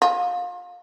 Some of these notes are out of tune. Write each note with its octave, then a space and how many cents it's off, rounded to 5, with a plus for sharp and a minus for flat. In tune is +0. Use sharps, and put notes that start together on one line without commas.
F4 +30